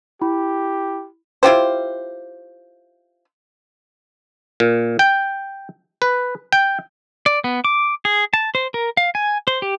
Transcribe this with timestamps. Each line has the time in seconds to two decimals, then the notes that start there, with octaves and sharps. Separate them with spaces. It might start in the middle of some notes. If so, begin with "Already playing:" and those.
0.22 E4 G4 B5
1.43 E4 F4 G4 C5
4.60 A#2
4.99 G5
6.02 B4
6.52 G5
7.26 D5
7.44 B3
7.65 D6
8.05 G#4
8.34 A5
8.55 C5
8.74 A#4
8.97 F5
9.15 G#5
9.47 C5
9.62 G4